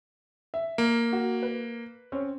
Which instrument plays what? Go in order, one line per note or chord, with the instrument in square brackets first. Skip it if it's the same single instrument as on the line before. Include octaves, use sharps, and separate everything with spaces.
[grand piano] E5
[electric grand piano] A#3
[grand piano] F#4
B4
C4 C#4